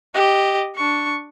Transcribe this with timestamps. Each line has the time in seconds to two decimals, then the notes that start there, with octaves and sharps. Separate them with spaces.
0.14 G4 D#5
0.76 D4 C#6